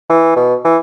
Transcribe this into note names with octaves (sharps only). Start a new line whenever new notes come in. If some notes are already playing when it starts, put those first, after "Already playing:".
E3
B2
E3